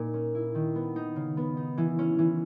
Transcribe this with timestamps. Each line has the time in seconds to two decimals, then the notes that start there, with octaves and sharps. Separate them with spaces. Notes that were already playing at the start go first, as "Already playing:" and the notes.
Already playing: A#2 D#4
0.14 C#4
0.35 E4
0.55 D#3
0.75 B3
0.96 D#4
1.16 C#3
1.37 B3
1.57 D#4
1.78 E3
1.99 C#4
2.19 E3